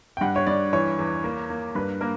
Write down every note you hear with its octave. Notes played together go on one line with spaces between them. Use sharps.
G5
G2 F#5
C#5
G2 D5
E3 C#5
E2
A#3
A#3
G2 B4
A#3 A#4